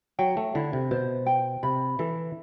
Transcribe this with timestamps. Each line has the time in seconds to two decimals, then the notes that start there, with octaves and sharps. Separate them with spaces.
0.19 F#3 G5
0.37 A3
0.55 D3 E4
0.73 C3
0.91 B2 C5
1.26 G5
1.63 C3 B5
1.99 E3 A4